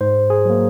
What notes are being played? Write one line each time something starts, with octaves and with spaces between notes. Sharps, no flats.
G#2 C5
G#4
F#3 A#3